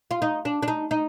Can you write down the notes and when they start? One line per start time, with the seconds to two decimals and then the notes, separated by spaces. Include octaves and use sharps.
0.11 F4
0.22 D#4
0.45 D4
0.62 D4
0.68 D#4
0.91 D#4